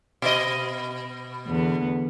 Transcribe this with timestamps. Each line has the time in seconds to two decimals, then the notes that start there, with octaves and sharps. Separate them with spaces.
0.22 B2 D#5
1.47 E2 D3 B3